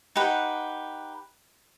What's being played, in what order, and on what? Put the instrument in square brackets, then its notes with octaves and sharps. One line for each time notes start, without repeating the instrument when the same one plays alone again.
[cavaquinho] D#4 G4 B4 F#5